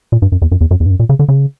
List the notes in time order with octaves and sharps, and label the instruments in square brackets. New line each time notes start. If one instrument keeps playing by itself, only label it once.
[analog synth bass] A#2
G2
F#2
E2
F#2
E2
F#2
E2
G2
F#2
A#2
C#3
D3
C#3